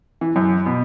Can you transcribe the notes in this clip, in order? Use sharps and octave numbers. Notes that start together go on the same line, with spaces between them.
E3
F#2
B2